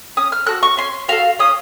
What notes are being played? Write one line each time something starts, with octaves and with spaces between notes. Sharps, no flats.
C#4 D#6
F6
F#4 A4 F#6
C#6
C#4 C6
F#4 A4 F5
C#4 D#6